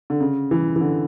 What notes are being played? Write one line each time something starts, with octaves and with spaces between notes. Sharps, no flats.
D3
C#3
E3
E3
D3